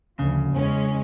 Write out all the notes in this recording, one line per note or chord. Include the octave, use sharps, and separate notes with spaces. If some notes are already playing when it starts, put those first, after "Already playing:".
D2 C#3 F3
E2 G#3 C#4